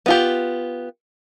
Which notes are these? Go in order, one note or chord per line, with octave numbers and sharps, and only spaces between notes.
B3 F4 G4